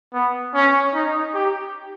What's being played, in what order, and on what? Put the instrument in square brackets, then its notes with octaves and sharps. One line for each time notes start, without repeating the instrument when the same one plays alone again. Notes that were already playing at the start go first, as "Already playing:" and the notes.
[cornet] B3
C#4
D#4
G4